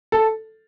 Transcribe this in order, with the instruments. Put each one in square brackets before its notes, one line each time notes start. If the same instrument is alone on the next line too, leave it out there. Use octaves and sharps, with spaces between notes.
[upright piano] A4